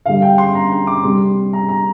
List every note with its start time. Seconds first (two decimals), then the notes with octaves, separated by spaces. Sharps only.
0.06 D3 G3 F5
0.22 G5
0.38 C6
0.55 A#5
0.72 C6
0.87 D6
1.04 C3 G3 C6
1.53 A#5
1.69 A#5